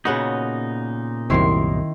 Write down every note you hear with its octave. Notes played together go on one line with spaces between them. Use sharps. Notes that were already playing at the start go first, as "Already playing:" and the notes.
A#2 C#3 B3 D#4 F#4
C2 F#2 C3 D#3 E4 C6